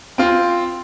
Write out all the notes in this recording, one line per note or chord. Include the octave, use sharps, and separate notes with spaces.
C4 F4